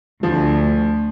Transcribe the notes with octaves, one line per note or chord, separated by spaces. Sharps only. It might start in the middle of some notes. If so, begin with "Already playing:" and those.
D2 F3